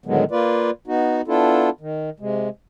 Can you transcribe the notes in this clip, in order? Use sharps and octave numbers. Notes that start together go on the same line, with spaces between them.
A2 D3 D#3 F#3 G#3 B3
A#3 F4 B4 D5
B3 D#4 F#4
B3 D4 E4 F4 A4
D#3
C3 G#3